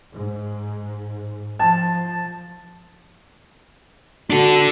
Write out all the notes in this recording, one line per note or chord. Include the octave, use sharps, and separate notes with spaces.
G#2
F3 A5
D4 F#4 A4